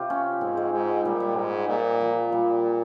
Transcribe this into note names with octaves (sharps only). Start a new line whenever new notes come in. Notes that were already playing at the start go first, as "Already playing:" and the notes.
Already playing: C3 F4 G4
C#4
G#2 C4
G#3
G#2
A#2 G3
G3
G#2
A#2
F3
A#2 G3